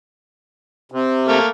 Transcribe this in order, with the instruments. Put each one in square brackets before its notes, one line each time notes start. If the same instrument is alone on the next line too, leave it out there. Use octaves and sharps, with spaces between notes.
[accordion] C3
[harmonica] A3 A#3